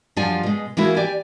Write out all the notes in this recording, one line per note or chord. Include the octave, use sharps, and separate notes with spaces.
F#2 F3 G3 D4 F4 G#5
B2 G#3
E3 G#3 A#3 B3 E4 F#4
G4 D5 G#5